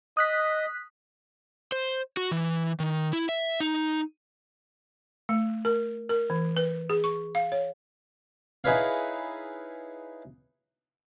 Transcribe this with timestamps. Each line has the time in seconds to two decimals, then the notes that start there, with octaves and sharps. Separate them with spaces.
0.17 D#5 D#6 F#6 B6
1.72 C5
2.17 F#4
2.32 E3
2.80 D#3
3.13 E4
3.29 E5
3.60 D#4
5.29 A3
5.65 A#4
6.09 A#4
6.30 E3
6.57 B4
6.90 G#4
7.04 C#6
7.35 F5
7.52 C#5
8.64 D#4 E4 G#4 B4 C#5 F5